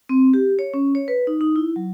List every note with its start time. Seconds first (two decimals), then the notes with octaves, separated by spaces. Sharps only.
0.09 C4
0.34 G4
0.59 C#5
0.74 C#4
0.95 C#5
1.08 B4
1.27 D#4
1.41 D#4
1.56 E4
1.76 F#3